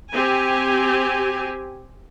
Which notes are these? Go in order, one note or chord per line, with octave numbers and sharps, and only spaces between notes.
C4 G4 G#5